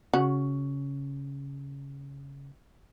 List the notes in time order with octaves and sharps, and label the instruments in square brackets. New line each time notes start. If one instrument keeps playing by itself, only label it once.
[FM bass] C#3 [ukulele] C#4 [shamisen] F#4